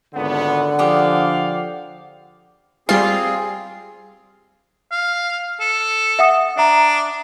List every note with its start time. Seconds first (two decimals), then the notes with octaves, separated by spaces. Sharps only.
0.14 G#1 C#2 D3 B3 F#5
0.79 F3 G4 G#4 D5 F5 D#6
2.89 G3 C4 F4 G#4 C7
4.92 F5
5.61 A4
6.19 E5 F#5 D#6
6.57 D4 E5 A#5